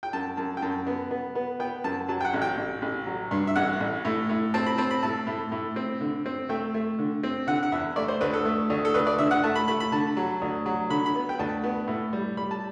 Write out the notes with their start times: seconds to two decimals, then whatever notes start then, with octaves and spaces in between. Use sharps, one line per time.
0.03 G5
0.13 F#2 A5
0.37 F#2 A5
0.57 G5
0.62 F#2 A5
0.87 B3
1.11 B3
1.35 B3
1.60 B3 G5
1.84 F#2 A5
2.08 F#3 A5
2.21 G5
2.25 F#5
2.34 A1
2.42 G5
2.57 A1
2.82 A1
3.07 F#3
3.31 G2
3.47 E5
3.56 A1 F#5
3.80 A1
4.05 A2
4.29 A2
4.54 C4 A5
4.66 B5
4.78 C4 A5
4.91 B5
5.03 A2 A5
5.27 A2
5.52 A2
5.76 C4
6.01 D3
6.26 C4
6.49 A3 G5
6.74 A3
6.98 D3
7.23 C4
7.47 D3 F#5
7.63 F#5
7.72 E2 E5
7.96 A3 D5
8.08 C5
8.21 D2 B4
8.33 A4
8.45 A3
8.70 D2
8.85 A4
8.94 D2 B4
9.07 D5
9.18 D3 E5
9.31 F#5
9.44 A3 A5
9.56 B5
9.68 A3 B5
9.80 B5
9.92 D3 A5
10.17 F#3
10.41 D2
10.66 F#3
10.90 D3 B5
11.06 B5
11.15 B3
11.29 G5
11.39 D2 A5
11.63 B3
11.88 A2
12.13 G3
12.37 G3 B5
12.51 A5